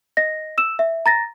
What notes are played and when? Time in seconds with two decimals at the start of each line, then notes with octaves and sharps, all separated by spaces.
0.17 D#5 A#6
0.58 E6 E7
0.79 E5
1.06 A#5 A6 A#6